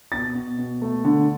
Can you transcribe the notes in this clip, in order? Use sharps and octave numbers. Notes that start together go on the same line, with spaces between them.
B2 A6
B2
B2
A3
D3